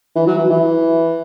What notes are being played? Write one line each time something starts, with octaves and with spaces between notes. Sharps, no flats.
E3
F#3
E3
E3